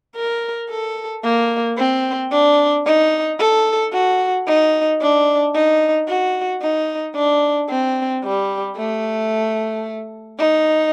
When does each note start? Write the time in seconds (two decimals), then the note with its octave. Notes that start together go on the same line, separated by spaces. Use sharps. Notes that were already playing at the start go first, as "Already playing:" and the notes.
0.16 A#4
0.70 A4
1.24 A#3
1.78 C4
2.31 D4
2.86 D#4
3.39 A4
3.93 F#4
4.47 D#4
5.01 D4
5.54 D#4
6.08 F#4
6.62 D#4
7.15 D4
7.70 C4
8.24 G3
8.77 A3
10.39 D#4